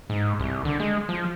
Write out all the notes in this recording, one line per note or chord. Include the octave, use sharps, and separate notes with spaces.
G#2
C2
D3
G#3
F3